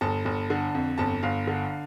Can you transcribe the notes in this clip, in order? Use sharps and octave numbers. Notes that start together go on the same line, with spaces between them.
G1 A5
G1
D3
F2
G1 A5
G1 F5
D3